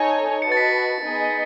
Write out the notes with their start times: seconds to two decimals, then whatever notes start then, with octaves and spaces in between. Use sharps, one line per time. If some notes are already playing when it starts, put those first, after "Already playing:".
Already playing: D#4 A4 C#5 G#5
0.42 F#4 B4 D#5 A5 C#7
0.52 A6
0.57 B6
1.02 B3 D#4 G#4 D#5